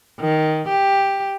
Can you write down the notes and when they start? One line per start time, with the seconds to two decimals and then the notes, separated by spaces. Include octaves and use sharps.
0.21 D#3
0.68 G4